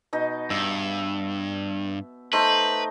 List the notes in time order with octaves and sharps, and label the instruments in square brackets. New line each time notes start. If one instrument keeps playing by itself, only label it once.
[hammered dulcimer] B2 D#4
[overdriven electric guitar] G2 [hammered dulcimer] E5
[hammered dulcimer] A3 D#4 C5 [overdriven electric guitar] B4